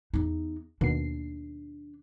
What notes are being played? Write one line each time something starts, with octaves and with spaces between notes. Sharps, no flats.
E2 D#4
D#2 B2 D4 C7